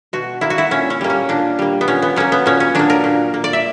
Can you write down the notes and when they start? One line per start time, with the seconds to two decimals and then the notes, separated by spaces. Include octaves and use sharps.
0.13 B2 F#4
0.41 A#3 E4
0.50 F#4
0.58 E4
0.71 A#2 C#4
0.90 C#4
1.01 G3 A#3
1.10 C#4
1.29 A#2 D4
1.59 G3 A#3
1.81 B3
1.88 A#2 C#4
2.02 B3
2.16 F#3 A#3 C#4
2.32 B3
2.46 A#2 C#4
2.60 C#4
2.75 F#3 A#3 D4
2.90 A#4
3.04 A#2
3.34 A#3
3.44 D5
3.53 E5